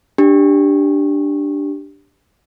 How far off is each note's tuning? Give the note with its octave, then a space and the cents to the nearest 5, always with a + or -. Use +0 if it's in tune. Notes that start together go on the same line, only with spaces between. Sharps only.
D4 +0 G4 +0